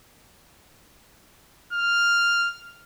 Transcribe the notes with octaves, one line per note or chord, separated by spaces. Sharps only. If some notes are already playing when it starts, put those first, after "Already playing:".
F6